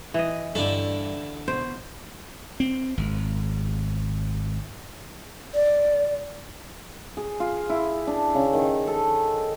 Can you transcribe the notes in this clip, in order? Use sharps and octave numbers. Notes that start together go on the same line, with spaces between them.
E3 D#5
G2 D3 E4 A4
B2 C5
C4
G#1
D5
G#4
F4
E4
D4
C#3
D#3
A4